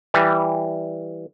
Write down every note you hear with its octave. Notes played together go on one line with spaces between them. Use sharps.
E3 G3